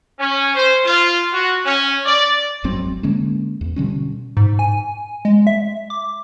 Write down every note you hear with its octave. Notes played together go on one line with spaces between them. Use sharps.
C#4
C5
F4
F#4
C#4
D5
G#1 F2 F#3 C4
D3 G#3 A#3 C#4
E2
B2 D3 G3 C#4
G#2
G#5
G#3
E5
D6